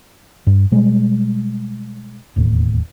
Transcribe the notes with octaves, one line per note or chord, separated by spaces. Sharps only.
G2
B2 G3 G#3
E1 D#2 A2